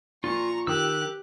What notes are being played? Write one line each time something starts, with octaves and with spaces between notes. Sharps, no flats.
A#2 F3 F4 A#5 C#6
D#3 G4 E6 F#6